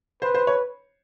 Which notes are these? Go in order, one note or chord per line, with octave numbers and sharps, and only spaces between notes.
B4 C5
C5
C#5